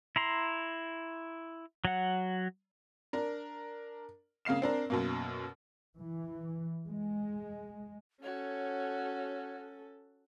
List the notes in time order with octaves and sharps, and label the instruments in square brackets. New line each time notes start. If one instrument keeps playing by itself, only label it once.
[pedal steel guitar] E4 A#5 C6
F#3 F#5
[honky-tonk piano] D4 A#4
C#3 A#3 F5 C7 E7
C4 D4 A#4
F#2 B2 A#3
[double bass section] E3
G#3
[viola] C#4 A4 [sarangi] F#4 [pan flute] C#5